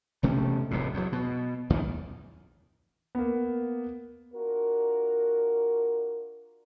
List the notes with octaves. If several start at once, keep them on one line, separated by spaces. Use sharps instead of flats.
E1 C3 A3 C#4
F1 D#2 A2
E2 F#3
B2
A1 D#2 A#2 D#3
A#3 B3
D4 F4 F#4 A#4